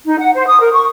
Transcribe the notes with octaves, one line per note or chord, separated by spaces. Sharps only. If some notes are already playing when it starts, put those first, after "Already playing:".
D#4
F#5
C5
D#6
A#4
C#6